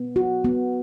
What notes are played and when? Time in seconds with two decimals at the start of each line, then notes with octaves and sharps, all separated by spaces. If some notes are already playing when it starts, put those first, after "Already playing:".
Already playing: B3
0.16 F#4
0.45 B3